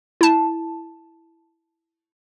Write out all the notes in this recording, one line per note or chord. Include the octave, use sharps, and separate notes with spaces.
E4 A5